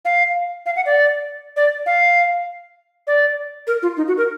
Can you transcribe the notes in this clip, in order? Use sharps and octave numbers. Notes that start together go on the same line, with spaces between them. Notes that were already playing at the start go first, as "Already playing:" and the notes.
F5
F5
F#5
D5
D5
F5
D5
A#4
F4
D#4
F#4
A#4